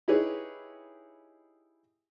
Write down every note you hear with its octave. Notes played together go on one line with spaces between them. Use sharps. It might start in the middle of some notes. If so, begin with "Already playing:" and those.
D#4 E4 G4 G#4 B4 C#5